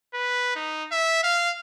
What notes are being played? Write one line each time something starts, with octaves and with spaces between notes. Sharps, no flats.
B4
D#4
E5
F5